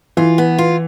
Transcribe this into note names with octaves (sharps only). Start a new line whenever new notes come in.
E3 F4
B3
F4